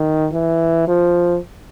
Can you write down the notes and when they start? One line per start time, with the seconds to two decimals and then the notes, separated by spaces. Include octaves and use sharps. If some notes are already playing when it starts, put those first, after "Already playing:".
Already playing: D#3
0.33 E3
0.88 F3